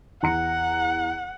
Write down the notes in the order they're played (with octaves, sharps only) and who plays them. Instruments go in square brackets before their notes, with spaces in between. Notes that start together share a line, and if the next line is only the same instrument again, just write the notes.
[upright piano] E2 A#5 C#7 [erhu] F#5